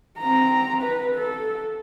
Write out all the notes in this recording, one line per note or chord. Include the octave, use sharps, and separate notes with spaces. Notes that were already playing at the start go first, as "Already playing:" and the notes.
C4 A#5
B4
A4